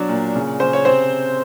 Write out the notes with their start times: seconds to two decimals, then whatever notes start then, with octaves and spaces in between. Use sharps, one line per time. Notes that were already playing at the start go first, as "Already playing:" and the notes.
Already playing: B2 F#3 D4 D5
0.09 A#2
0.35 C#3
0.60 C#3 C5
0.73 C#5
0.85 C3 C4 C5